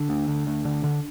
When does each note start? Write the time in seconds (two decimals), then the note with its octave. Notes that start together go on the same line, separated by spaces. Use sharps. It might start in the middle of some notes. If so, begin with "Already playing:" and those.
Already playing: D3 D4
0.09 D2
0.28 D2
0.47 D2
0.65 D3
0.84 D3